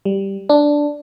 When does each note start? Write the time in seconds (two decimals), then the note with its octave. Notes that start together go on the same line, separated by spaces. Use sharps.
0.05 G3
0.49 D4